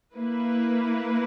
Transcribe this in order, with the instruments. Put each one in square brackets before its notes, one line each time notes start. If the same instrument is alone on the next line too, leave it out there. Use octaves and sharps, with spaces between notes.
[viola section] A#3 E4 B4